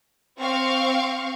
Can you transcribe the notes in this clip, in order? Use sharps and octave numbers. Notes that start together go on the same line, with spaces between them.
C4 F5 C#6